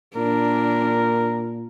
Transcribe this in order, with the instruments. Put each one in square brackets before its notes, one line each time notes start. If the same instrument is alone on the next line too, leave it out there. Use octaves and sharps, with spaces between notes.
[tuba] A#2 [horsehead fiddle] D4 [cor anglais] A#4